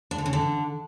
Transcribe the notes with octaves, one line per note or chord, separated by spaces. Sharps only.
D4
D3
C#3
D3